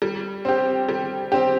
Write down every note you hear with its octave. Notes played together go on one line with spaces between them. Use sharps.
G3
C4 G4
G3
C4 G4